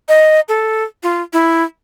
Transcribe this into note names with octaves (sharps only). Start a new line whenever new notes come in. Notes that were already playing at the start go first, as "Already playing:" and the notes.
D#5
A4
F4
E4